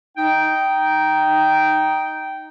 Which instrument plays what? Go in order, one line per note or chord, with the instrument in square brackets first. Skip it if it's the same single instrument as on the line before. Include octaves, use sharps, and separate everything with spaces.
[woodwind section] D#4 G5